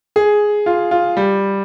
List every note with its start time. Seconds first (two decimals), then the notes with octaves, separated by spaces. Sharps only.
0.16 G#4
0.66 F4
0.91 F4
1.17 G3